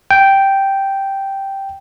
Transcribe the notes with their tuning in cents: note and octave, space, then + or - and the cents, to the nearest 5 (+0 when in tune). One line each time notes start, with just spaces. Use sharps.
G5 -5